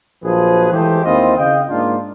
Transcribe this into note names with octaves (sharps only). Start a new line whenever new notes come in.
A#1 F3 F#3 G#4 B4
E3 G#3 A3 G4 C5
D#2 C4 E4 F4 D#5
C#3 D#5 F5 G5
G#2 A#3 D4 F4